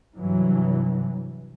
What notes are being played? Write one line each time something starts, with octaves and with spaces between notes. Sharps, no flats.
G2 C3 E3 F#3